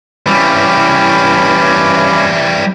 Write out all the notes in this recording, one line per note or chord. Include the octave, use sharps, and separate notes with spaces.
E3 G3 C#4 B5 D6